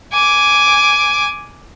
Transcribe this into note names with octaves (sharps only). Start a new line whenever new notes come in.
G#5 D6